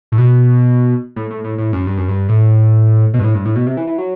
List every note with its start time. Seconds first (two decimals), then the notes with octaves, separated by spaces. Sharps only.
0.12 A2
0.18 B2
1.16 A2
1.30 A2
1.44 A2
1.58 A2
1.73 F#2
1.87 G2
1.98 F#2
2.08 G2
2.29 A2
3.14 B2
3.19 G2
3.24 A2
3.35 G2
3.45 A2
3.56 B2
3.67 C3
3.77 E3
3.87 E3
3.98 F#3